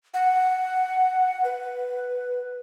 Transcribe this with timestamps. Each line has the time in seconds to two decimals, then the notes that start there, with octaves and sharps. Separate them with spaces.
0.14 F#5
1.44 B4